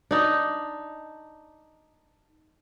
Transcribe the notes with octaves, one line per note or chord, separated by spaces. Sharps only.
D4 D#4